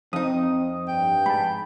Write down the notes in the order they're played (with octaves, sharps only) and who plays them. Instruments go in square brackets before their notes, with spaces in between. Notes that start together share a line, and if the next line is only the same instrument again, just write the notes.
[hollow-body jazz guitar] F2 D#4 [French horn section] C4 [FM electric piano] D#6
[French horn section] G2 [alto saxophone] G5
[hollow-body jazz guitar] G#2 [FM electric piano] A5 B5